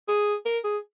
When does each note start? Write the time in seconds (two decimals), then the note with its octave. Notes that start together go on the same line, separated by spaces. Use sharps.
0.08 G#4
0.46 A#4
0.64 G#4